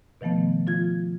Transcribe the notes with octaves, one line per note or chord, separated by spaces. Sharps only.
B2 D#3 F3 A3 B3
F3 F4 G#6